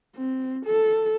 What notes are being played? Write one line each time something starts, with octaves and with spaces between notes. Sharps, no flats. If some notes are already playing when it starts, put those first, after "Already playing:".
C4
A4